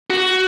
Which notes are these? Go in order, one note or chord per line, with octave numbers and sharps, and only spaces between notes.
F#4